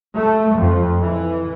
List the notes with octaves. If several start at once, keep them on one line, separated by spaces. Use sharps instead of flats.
A3
F2
E3